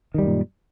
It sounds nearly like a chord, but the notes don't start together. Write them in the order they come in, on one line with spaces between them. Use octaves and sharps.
D#3 G3 F#2 A#2